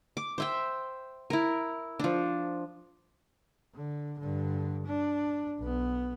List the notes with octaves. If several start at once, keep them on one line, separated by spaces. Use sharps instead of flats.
D6
C5 E5 G5
E4 A#4
F3 D4
D3
G2 D3
D4
B1 B3